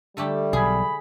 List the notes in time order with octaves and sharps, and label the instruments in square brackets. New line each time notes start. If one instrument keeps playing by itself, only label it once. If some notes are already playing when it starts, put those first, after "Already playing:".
[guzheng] D3 A3 G4 [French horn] G3
[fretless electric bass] B1 [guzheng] G#4 [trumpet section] B5